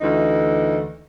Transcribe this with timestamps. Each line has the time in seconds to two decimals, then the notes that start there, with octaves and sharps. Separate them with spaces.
0.01 D2 E3 D#4